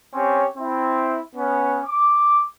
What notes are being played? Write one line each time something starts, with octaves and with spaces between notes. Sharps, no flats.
C4 C#4 G4 C#5
C4 E4
B3 C#4
D6